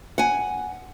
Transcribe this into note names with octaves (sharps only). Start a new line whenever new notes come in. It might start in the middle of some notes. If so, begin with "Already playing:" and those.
F#5 G#5